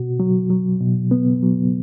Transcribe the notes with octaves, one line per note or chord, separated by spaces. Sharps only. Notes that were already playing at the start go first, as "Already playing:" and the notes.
Already playing: B2 F#4
F#3
F#3
B2
B3
F#3